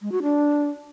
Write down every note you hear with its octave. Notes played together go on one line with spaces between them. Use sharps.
G#3
F#4
D4